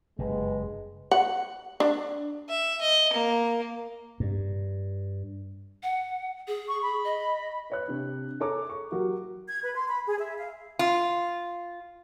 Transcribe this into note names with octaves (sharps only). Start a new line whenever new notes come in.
F#1 G2 G#3 B4
F#5
D4
E5
D#5
A#3
G2
F#5
G#4
C#6
B5
D#5
B4 C#5 F#6
C3 D4
G#4 A4 C#5 A#5 D6
C#6
F#3 F#4 G4 A#4
G#6
B4
C6
B5
G#4
E5
F5
F4